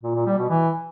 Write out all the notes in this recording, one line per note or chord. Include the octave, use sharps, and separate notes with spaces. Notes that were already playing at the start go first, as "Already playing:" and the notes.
A#2
A#2
G3
B2
E3